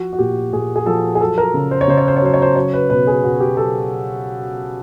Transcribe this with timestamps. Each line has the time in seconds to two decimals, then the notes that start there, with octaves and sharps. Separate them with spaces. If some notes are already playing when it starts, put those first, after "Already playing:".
Already playing: F3 F#4
0.13 F#4
0.19 A#2 G4
0.52 A#2 G#4
0.76 G#4
0.86 F3 A4
1.15 G#4
1.21 F#3 A4
1.38 A#4
1.54 C#3
1.71 C5
1.81 C#5
1.88 C#3 C5
1.98 C#5
2.08 C5
2.17 C#5
2.22 F#3 C5
2.34 C#5
2.42 C5
2.56 F#3 C#5
2.73 B4
2.90 B2 B4
3.07 G#4
3.24 B2 F#4
3.40 G4
3.57 F#3 A4